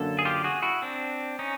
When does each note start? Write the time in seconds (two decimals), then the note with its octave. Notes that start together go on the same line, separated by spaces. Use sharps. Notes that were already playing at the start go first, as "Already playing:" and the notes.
Already playing: F#2 D3 F#3 A#3 D4 A4
0.19 G#4
0.25 F4 G4
0.44 F#4 G#4
0.62 E4 F#4
0.82 C4 D4
1.39 C#4 D#4